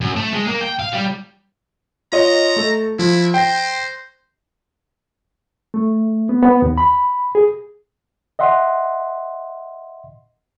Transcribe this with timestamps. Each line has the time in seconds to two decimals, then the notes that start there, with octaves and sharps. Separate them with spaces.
0.01 F#2
0.16 A3
0.33 G#3
0.47 A#3
0.61 G5
0.79 F5
0.92 G3
2.12 F4 C#5 D#5 A#5
2.56 A3 A4
2.99 F3 E4
3.34 C5 G5 A#6
5.74 A3
6.29 B3
6.42 B3
6.62 D#2
6.78 B5
7.35 G#4
8.39 D#5 E5 F#5 C6